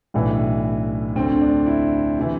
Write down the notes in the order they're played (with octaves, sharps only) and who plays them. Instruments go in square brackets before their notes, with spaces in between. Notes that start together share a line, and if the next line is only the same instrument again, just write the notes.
[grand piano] B1 A2 E3 D4
D2 D3 C4
D4
E4
C3 E3